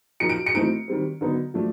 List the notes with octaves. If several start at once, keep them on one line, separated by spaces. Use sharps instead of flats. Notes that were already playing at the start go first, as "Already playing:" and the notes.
F3 A#3 D#4 C#7
D7
C#7
E3 A3 C4 D#4 D7
D#3 G3 C4
D3 F#3 B3 D#4
F3 A3 D4